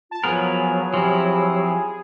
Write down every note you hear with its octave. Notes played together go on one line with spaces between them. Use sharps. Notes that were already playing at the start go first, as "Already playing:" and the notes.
F4 A5
F3 F#3 B3 G#4 A#4
F3 C4 E4 G4